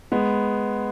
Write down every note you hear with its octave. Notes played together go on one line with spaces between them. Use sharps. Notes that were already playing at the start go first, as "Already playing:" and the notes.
G#3 B3